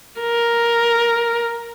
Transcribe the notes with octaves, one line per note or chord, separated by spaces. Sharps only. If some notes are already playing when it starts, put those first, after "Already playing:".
A#4